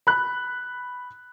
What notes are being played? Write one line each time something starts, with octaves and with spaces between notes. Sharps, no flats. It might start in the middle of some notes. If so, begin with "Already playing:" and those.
B5 F#6